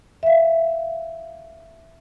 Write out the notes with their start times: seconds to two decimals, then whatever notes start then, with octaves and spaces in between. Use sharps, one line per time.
0.23 E5 F5